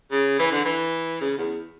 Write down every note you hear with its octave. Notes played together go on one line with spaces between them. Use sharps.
C#3
E3
D3
E3
C#3
E2